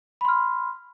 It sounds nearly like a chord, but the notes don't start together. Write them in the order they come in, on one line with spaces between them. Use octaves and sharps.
B5 C6 F6